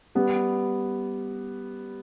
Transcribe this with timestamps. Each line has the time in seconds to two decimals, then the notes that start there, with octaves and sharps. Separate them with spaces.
0.15 G3 B3